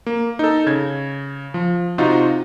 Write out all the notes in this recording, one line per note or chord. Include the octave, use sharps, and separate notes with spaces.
A#3
D#4 A4
C#3 G#6
F3
C3 D#4 F4 F#4